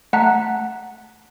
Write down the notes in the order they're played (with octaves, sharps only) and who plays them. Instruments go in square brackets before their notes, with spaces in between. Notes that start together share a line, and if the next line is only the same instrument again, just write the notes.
[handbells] A3 F#5 A5 A#5 F#6 B6